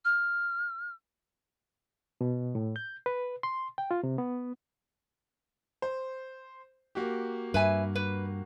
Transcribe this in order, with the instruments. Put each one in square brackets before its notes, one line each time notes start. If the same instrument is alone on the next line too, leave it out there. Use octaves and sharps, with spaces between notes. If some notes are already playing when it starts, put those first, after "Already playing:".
[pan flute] F6
[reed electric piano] B2
A2
G6
B4
C6
G5
F4
C3
B3
[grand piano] C5
A#3 F#4 G4
[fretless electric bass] G2 [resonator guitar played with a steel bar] B4 E5 G#5
[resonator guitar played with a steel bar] B4